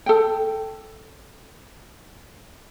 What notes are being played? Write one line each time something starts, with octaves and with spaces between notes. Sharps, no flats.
A4 G5